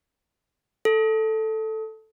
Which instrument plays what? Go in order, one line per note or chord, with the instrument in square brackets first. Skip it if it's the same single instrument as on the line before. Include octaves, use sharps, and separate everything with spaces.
[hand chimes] A4